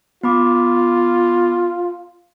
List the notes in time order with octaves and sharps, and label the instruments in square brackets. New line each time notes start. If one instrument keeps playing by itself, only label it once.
[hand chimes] B3 B5 D6 [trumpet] F4